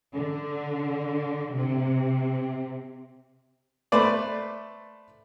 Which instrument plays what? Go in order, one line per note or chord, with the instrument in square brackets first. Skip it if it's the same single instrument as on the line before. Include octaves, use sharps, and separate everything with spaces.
[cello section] D3
C3
[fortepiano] A3 B4 C5 D5